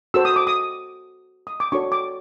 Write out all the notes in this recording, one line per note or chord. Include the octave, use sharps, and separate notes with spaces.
F#4 A4 C5 E6
D#6
D6
D#6
D#6
D6
D4 F#4 A4 C#5 C#6
D6